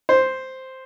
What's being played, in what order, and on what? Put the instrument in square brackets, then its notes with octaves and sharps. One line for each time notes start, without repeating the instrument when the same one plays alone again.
[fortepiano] C5